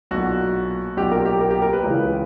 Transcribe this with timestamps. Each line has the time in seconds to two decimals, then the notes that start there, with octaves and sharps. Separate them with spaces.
0.11 B1 A#2 F#4
0.97 B1 A#2 G4
1.12 A#4
1.26 G4
1.40 A#4
1.51 G4
1.62 A#4
1.73 B4
1.84 C#2 C#3 E3